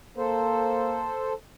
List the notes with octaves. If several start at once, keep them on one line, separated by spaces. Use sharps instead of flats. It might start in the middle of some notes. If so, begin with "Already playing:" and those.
A#3 A4 C5